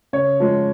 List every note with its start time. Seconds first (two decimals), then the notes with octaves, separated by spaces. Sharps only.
0.13 C#3 C#5
0.40 F3 G#3